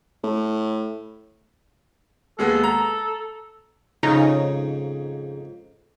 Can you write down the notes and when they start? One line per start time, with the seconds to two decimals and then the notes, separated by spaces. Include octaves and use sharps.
0.24 A2
2.39 D#2 G#3 B3 A4
2.64 A#5
4.03 F2 G#2 C#3 D#4